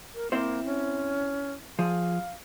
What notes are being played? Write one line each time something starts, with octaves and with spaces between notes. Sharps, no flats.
A#4
A#3 C4 E4 C5
C#4
F3 G#4 F5